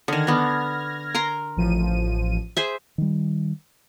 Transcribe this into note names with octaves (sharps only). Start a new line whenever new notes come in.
D3 D#3 F6 G#6 A#6
B3 D4
A#4 A#5 C6
A1 F3 D#7
G#4 C5 E5
D#3 G3